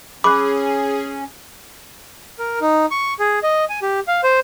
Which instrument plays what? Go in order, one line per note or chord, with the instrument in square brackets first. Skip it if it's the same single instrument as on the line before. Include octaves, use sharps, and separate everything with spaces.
[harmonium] C#4 [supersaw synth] G#4 [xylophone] B5 F#6 [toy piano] D6
[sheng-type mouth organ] A#4
D#4
C#6
G#4
D#5
G#5
G4
F5
C5